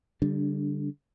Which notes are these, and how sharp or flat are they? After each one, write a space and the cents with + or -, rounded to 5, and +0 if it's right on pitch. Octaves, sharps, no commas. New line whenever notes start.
D3 -30 G3 +0 D4 +0